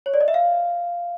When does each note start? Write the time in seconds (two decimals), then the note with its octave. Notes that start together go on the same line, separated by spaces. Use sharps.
0.06 C#5
0.14 D5
0.21 D#5
0.28 E5
0.34 F5